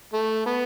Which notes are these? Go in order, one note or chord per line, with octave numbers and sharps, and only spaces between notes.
A3
B3